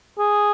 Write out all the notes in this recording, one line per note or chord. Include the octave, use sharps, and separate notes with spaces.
G#4